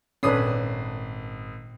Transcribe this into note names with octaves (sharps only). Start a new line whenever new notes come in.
G#1 A#2 C#4 D4 A4 B4 D#6 C7